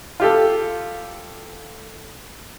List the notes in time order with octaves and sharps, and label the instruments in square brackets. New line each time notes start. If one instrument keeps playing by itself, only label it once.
[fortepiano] F4 G4 A4